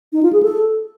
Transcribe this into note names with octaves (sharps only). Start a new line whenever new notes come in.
D#4
F4
G#4
A4